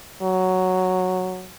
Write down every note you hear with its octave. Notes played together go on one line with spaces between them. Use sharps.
F#3